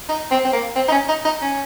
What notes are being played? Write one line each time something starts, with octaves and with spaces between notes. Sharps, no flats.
D#4
C4
C4
A#3
C4
D#4
C#4
D#4
D#4
C#4